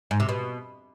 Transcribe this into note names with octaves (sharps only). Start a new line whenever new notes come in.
G#2
C3
B2